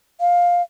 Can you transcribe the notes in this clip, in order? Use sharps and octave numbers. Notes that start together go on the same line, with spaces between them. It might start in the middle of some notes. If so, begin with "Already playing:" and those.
F5